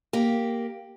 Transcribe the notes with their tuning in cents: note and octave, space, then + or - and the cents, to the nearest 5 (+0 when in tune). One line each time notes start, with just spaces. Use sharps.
A#3 +0 G4 +0